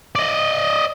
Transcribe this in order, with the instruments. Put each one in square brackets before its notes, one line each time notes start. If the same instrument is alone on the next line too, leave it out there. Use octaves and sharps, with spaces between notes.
[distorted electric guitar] D5 D#5